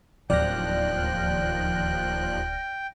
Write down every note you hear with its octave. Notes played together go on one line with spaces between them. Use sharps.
D1 D#2 F3 D5 G5 F6 F#6 A#6